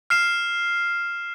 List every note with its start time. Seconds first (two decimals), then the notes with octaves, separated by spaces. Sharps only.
0.10 F6 C7 E7